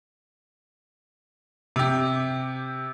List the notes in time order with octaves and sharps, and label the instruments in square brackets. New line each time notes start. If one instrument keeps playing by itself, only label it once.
[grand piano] C3 G4